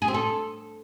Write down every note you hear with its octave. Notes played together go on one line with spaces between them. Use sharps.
G#4
C4
A4